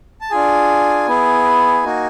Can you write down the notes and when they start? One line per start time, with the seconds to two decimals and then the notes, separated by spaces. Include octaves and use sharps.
0.21 A5
0.31 D4 F4 G#4 G#5
1.08 B3 E4 G#4
1.83 A#3 D#4 F#4